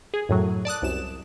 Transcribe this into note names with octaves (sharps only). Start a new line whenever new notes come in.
G#4
F#2 A2 F#3
D5 A5 D#6 F#6
C2 F#2 E7